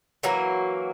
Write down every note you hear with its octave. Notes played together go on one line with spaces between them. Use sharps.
E3 F#3 A#3 F#4